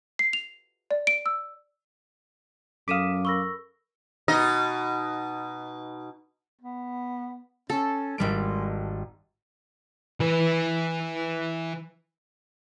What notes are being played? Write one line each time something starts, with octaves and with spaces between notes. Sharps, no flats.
C7
F7
D5
D7
E6
F#2 A4 F5 D6 D#6 B6 D#7 E7
A#4 B5 C#6 E6 A#6 G7
B2 D#4 D#5
B3
C#4 A4
G#1 G3 G#3 D7
E3 B4